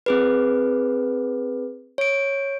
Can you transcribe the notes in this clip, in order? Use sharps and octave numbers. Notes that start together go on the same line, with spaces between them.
C4 G#4 B4
C#5 D7